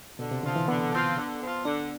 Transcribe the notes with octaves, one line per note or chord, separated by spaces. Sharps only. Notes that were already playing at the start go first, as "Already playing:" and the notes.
B2 D3
C3
D3 F3 C4 F4
E3
D3 B3
F3 C4 F4
D3
F3 C4 F4
D3 D4